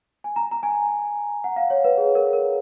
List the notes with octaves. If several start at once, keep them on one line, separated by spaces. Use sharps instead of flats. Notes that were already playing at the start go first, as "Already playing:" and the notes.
G#5
A#5
A#5
G#5
F#5
F5
C#5
B4
G#4
A#4
A#4